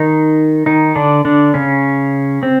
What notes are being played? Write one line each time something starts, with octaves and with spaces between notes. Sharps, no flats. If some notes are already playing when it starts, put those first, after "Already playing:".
Already playing: D#3 D#4
D#3 D#4
D3 D4
D3 D4
C#3 C#4
C4